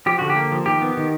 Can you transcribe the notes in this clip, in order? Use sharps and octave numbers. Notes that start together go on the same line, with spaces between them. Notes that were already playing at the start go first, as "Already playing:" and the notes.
F3 G4
D3 F#4
G4
A#3
F3
D#3 G4
B3
D#3